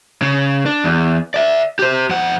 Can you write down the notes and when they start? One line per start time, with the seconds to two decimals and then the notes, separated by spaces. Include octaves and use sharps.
0.22 C#3
0.66 D4
0.84 E2
1.34 D5 E5
1.79 G4 C5
2.09 F2 F#5